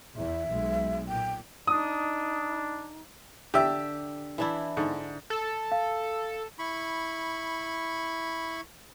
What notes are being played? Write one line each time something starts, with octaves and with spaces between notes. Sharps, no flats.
E2 E5
B1 G#3
A#2 G5
D4 D#4 D#6
D3 G4 E5
E3 D4 E4
G#2 D3
A4
F5
E4 B5 C#6